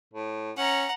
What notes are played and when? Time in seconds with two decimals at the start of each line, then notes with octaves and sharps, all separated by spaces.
0.13 A2
0.57 C#4 F#5 A#5